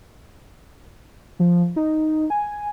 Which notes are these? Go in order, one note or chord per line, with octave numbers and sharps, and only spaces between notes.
F3
D#4
G#5